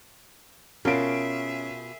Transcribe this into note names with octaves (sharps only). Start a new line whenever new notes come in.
B2 C#4 F4 G#4 A#4 E5 D7